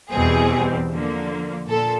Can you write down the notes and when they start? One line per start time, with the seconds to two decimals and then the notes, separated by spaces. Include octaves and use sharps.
0.12 E2 B2 G3 C4 G#4
0.90 D3 F3 A#3
1.69 A#2 A4